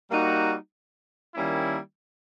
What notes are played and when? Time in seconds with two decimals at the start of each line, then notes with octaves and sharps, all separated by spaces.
0.11 G3 A#3 D#4 F#4
1.35 D#3 G3 A#3 C#4 E4